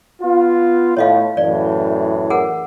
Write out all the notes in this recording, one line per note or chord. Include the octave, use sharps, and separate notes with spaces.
B3 F4
A2 C#5 D#5 F5
F#2 A2 E3 D5
G#4 A#4 F#5